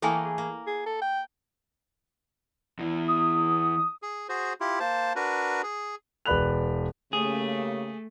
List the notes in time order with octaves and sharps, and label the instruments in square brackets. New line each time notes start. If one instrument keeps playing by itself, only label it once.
[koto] E3 A3 A#3 [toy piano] A4 G5 G#5
[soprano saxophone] G#4
[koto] A#3
[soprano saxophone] G#4
A4
G5
[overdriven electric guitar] E2 E3
[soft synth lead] D#6
[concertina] G#4
F#4 G#4 C5
E4 F4 G4
A#3 C5 A5
D4 F#4 A#4 B4
G#4
[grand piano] E1 B4 D5 B5 F#6 F7
[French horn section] C#3 A#3 G4 [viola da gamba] A3 [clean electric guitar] G#4